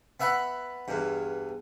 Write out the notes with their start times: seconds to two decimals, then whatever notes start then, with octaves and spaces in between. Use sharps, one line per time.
0.20 B3 E5 F#5 B5
0.88 E2 G2